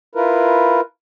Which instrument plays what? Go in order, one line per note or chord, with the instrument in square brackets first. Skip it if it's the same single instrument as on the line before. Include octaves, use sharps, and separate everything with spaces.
[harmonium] E4 F4 A#4 B4